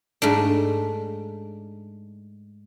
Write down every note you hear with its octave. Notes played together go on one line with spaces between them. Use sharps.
G#2 A3 D4